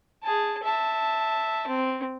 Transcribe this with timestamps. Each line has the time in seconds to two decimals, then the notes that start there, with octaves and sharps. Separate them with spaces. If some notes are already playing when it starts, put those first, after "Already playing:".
0.23 G#4 A5
0.64 E5 A5
1.67 C4